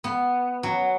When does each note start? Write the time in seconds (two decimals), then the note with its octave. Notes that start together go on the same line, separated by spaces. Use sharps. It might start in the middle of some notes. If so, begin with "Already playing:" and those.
0.04 B3
0.63 F#3